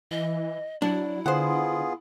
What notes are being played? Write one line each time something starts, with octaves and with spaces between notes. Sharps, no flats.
E3 D#5
F#3 D4 E4
D3 B3 F4 G#4 C5 F#5